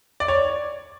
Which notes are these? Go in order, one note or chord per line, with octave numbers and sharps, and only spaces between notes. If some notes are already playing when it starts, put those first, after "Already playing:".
D5
C#5